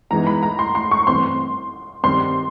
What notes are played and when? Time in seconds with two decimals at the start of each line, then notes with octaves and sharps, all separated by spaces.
0.10 G#2 E3 G#3 B3 D#4 A#5
0.27 B5
0.43 A#5
0.59 C6
0.75 C6
0.91 C#6
1.07 G2 E3 A3 C4 C6
2.03 G2 D#3 G3 C4 D#4 C6